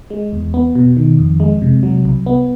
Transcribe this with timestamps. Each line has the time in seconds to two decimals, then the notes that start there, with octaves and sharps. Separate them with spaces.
0.10 G#3
0.32 E2
0.54 B3
0.75 B2
0.97 D#3
1.19 F2
1.40 G#3
1.62 C3
1.83 F#3
2.05 C2
2.26 B3